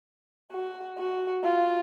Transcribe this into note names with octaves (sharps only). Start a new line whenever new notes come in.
F#4
F#4
F4